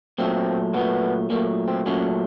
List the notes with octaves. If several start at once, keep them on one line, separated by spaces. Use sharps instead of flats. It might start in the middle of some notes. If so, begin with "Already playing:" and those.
A#2 F#3 A3 C4
A#2 F#3 A3 B3
A#2 F#3 A3 A#3
C4
A#2 F#3 A3 C#4